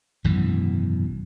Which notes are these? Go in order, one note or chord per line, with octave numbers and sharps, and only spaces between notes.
G#1 F#2 B2 E3